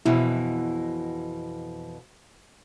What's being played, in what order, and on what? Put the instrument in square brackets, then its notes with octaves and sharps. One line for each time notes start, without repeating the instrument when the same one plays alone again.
[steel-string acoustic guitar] F2 B2 E3 [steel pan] E4